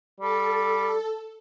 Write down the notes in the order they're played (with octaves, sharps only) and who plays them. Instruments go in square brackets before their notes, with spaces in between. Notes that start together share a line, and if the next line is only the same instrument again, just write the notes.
[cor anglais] G3 [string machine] A4